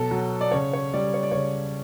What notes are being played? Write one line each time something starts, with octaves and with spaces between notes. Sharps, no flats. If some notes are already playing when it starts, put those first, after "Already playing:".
Already playing: B2 F#3 A4
F#3
D5
C#3 C#5
C#5
G3 D5
C#5
D5
C#3 C#5